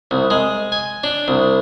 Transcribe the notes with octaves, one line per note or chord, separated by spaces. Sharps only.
C2
G#3
G#5
D4
C2